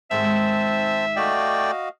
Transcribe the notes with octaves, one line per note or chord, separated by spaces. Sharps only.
G#2 D#3 G#3 C4 C5 E5 A5
A3 F#4 D5 D#5 F5 G5